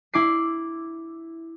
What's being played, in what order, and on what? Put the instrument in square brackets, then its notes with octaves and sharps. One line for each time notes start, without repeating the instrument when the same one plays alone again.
[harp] E4 D6 C7